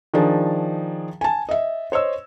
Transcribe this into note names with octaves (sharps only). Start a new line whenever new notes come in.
D#3 F3 D4 G#4
G#5 A5
D#5 E5
C5 C#5 D#5 E6